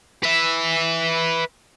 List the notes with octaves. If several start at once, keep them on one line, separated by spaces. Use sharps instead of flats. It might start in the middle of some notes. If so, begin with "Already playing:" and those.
B4 E5